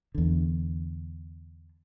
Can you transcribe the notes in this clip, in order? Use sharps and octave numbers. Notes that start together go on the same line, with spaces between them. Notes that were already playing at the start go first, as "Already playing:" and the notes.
E2 D3